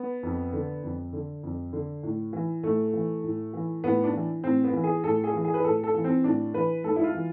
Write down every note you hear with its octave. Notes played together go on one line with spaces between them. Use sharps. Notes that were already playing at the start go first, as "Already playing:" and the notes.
Already playing: B3
F2
D3
F2
D3
F2
D3
A2
E3
A2 A3
E3
A2
E3
A2 B3
D4
E3
A2 C4
B3
E3
G#4
A2 A4
G#4
E3
G#4
B4
A2 A4
A4
E3
C4
A2 D4
E3 B4
G#2 A4
E4
F4
E3